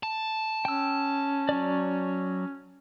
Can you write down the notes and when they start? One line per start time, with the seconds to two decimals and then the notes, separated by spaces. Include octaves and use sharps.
0.03 A5
0.65 C#4 G5 E6
1.49 F#3 D5